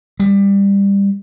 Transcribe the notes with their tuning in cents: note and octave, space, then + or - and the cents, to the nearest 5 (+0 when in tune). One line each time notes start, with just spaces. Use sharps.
G3 +20